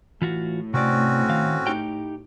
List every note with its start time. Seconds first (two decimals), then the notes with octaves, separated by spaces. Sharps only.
0.22 A2 E3 F4 F#4
0.74 C3 C4 C#4 F#4 D5
1.29 D#3 F5
1.67 D#4 G4 G5